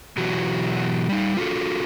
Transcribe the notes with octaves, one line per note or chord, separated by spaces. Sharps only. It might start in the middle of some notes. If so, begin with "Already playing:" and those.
B2 E3 F#3 F#4 G4
G3 D#4
F4 F#4 A4